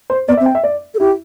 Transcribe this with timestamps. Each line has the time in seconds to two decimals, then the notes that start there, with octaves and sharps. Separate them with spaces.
0.10 C5
0.28 B3 D5
0.37 E5
0.40 C4
0.46 G5
0.55 E5
0.64 D5
0.95 A4
0.99 E4 G4